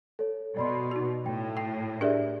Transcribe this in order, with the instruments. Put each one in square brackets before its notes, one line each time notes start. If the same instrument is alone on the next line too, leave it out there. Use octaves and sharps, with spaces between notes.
[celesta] A4 C#5
[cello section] B2 [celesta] D5 B5 C6
[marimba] D#4 F#4
[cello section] A2 [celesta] G5
[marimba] G5 [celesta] C7
[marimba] D4 G4 G#4 [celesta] A#4 D5 E5